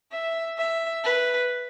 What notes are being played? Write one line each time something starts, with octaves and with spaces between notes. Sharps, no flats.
E5
E5
B4